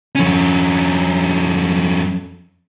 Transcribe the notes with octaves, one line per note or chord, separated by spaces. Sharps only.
F2 C#4